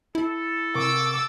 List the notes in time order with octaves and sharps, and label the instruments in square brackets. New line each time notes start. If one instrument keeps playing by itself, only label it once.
[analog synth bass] E4 [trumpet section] A4
[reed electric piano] C3 A#4 C#6 [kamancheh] D6 E6